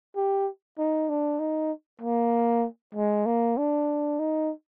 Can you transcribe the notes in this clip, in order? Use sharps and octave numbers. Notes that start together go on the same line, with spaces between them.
G4
D#4
D4
D#4
A#3
G#3
A#3
D4
D#4